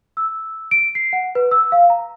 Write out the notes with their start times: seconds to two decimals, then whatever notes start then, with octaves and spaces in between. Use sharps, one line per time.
0.17 E6
0.71 D7
0.95 C7
1.13 F#5
1.35 B4
1.51 E6
1.72 F5
1.90 A#5